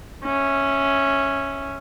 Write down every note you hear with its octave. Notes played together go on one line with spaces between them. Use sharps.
C#4 E5